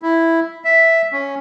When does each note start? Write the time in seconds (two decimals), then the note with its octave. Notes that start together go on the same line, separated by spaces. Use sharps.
0.02 E4
0.64 E5
1.13 C#4